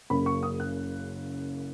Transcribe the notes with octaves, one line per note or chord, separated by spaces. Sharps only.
F#1 F#2 C#3 B5
C#6
D#6
F#6